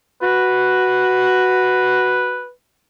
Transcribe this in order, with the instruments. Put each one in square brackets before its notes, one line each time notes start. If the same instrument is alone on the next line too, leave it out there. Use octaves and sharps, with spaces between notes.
[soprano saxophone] F#4 [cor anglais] B4